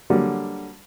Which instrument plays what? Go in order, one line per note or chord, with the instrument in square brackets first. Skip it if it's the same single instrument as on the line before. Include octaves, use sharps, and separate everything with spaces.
[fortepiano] D3 F#3 G3 A#3